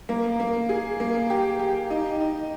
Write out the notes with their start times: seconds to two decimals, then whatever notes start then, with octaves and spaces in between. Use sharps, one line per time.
0.09 A#3
0.40 A#3
0.69 G#4
1.00 A#3
1.30 G4
1.59 G4
1.90 D#4
2.20 D#4